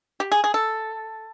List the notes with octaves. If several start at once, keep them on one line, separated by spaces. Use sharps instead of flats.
G4
G#4
G#4
A4